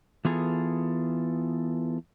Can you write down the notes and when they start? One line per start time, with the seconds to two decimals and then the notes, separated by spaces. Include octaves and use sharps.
0.25 E3 B3 F4 G#4 A4